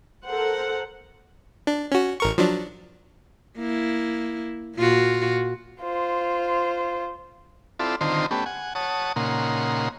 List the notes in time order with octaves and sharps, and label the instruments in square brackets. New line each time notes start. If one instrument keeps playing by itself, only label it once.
[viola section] A4 A#4 C5 F#5
[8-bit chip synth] D4
C#4 F#4
A1 A#4 C#6
F3 F#3 D4
[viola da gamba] A#3 E4
A#2 F4 F#4
[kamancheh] F4 C5
[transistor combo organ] C4 E4 F4 A4 D5
D3 D#3 C4 D#4 F4 C5
A3 B3 C#4 G4
F#5 G#5
C#5 F#5 A5 D#6
A#2 C#3 A#3 D#4 F#5 C6